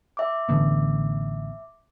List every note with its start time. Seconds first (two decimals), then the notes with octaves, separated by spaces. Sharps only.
0.17 E5 D6
0.49 A1 D3 B3